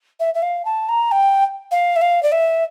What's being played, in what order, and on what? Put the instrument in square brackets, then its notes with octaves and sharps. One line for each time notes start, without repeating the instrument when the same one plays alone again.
[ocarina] E5
E5
F5
A5
A#5
G5
F5
E5
F5
D5
E5